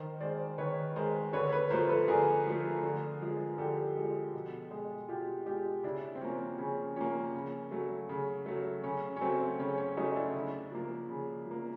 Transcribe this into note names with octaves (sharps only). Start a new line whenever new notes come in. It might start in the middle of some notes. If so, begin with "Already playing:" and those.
Already playing: D#3 A#4 C5
G#3 C5 D5
D#3 B4 C#5
G#3 A#4 C5
D3 B4 C#5
B4 C#5
F3 A3 A#4 C5
A4 B4
D3 G#4 A#4
F3 A3
D3
F3 G#3
D3 G4 A4
F3 G#3
B2
G#3
B2 F4 G4
G#3 F4 G4
C#3 D4 E4
C4
F3 A#3 C#4
C#3 C#4
F3 A#3 C#4
C#3
F#3 A3
C#3
F#3 A3
C#3 C#4
C#4
F#3 A3 C4
C#3 C#4
C#4
F#3 A3 C#4 D#4
D4 E4
C#3
F3 A#3
C#3
F3 A#3